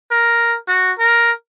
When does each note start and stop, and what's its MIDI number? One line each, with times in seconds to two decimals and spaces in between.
0.12 0.57 70
0.68 0.92 66
0.99 1.31 70